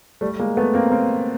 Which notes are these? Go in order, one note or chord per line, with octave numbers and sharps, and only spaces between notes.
G3 A3
G#3 A#3
A3 B3
A#3 C4
A#3 C4